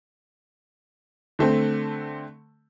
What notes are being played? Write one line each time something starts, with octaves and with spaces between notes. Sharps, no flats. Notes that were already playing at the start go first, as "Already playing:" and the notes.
D3 A3 C4